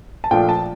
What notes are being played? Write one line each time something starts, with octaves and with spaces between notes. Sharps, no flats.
A5
A#2 F3 A3 D4 F4 G5
A5